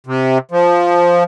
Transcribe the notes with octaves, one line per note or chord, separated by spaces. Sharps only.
C3
F3